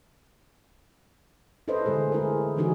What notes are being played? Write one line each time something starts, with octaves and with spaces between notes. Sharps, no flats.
E4 A4 B4 C5 D#5
D3 G#3 A3 G#4
E4 G#4 A#4
D3 E3 G#3 D#4 F#4 G#4